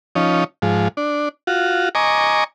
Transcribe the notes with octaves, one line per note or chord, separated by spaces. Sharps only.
F3 C#4 D#4
G#2 F3
D4
F4 F#4
D#5 G#5 A#5 C#6 D6